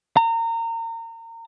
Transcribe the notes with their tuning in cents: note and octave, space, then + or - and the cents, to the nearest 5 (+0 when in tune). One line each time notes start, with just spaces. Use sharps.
A#5 -30